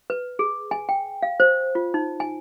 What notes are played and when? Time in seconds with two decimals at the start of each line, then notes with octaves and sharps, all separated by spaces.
0.10 B4
0.39 G#4
0.71 G#5
0.89 G5
1.23 F5
1.40 C5
1.75 F4
1.94 D#4
2.20 G#5